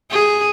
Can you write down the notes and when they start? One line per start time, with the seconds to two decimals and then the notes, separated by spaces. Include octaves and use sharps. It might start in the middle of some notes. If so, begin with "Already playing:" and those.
0.11 G#4